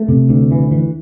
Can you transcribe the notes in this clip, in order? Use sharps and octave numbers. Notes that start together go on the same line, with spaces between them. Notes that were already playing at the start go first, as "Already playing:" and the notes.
Already playing: A3
C3
D2
E3
E3